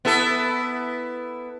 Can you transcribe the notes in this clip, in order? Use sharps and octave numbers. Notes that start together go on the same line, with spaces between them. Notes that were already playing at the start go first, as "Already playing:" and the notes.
B3 E4 A4